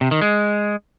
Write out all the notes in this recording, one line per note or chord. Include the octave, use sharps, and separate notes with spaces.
C3
D#3
G#3